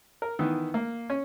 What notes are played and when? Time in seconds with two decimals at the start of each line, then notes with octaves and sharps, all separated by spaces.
0.22 A#4
0.39 D#3 E3 B3
0.74 A#3
1.10 C#4